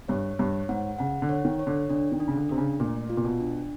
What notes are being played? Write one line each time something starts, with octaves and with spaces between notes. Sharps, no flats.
G2 C#5
G2 C#5
G#2 F#5
C#3 F#5
D3
C#5
D#3
C#5
D3
D3 D4
D#3
D4
C#3
D3
C3 D4
C#3
A#2 A3
F4
A#2
B2
D4